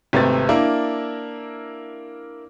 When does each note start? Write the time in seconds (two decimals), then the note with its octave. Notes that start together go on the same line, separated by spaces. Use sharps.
0.13 G#1 C3 A3 B3 C4 A6
0.49 A#3 D4 E4 A#4